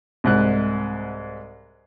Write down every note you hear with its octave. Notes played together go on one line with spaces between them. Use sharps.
C2 G#2 F#6